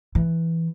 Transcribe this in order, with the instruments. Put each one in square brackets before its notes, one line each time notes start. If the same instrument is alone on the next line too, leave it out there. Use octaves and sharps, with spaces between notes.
[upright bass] E3